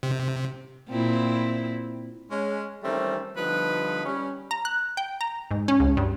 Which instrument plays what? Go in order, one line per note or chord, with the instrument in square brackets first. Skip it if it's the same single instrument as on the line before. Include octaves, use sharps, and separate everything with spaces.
[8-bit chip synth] C3
[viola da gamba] A#2 C4 E4
[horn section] G#3 C#4
D#3 E3 G3 A3 C4 C#4
D3 F3 G3 B3 D#4 B4
G3 C#4
[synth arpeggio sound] A#5
F#6
G5
A#5
G#2
C#4
C#2
G2